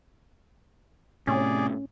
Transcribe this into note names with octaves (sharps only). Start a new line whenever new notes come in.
A2 C3 C#4 G#4 D5